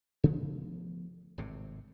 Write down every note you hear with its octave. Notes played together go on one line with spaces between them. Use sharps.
C#3 F3 A3 B3
G#1 A2 C3